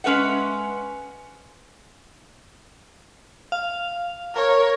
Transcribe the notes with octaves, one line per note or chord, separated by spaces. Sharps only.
G#3 C#4 B4 E5 F#5
F5
A#4 C#5